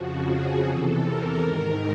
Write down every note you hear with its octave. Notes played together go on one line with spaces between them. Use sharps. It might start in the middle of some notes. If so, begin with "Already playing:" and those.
Already playing: F2 C#3 F3 F#4
G#4
E2 C3 E3 A4
A#4
G#2 D#3 A#4